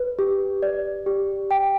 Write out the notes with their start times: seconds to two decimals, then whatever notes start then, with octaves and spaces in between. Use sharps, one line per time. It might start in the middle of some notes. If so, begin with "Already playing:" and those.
Already playing: B4
0.19 G4
0.62 D5
1.06 G4
1.51 G5